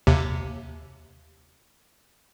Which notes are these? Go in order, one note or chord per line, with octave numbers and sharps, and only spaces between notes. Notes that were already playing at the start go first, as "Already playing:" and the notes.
D#2 C3